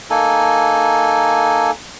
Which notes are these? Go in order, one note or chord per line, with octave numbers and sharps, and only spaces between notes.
A#3 D#4 A4 G#5